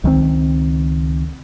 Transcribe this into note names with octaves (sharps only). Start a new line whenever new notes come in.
C#2 D#3 G3 C4